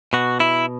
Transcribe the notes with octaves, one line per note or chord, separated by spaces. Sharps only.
B2 F#4
E4